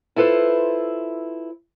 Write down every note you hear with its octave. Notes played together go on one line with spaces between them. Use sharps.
E4 F4 A4 B4 C5